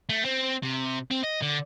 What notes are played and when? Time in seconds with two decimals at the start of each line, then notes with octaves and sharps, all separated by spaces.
0.09 A3
0.25 C4
0.63 C3
1.11 C4
1.24 D#5
1.43 D3